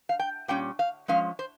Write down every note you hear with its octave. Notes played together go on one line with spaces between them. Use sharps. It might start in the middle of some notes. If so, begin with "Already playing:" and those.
F5
G5
A#2 G3 C#4 G5
F5
F3 G#3 C#4 F5
C5